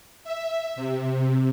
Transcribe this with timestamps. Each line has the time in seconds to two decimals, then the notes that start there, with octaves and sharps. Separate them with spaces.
0.24 E5
0.76 C3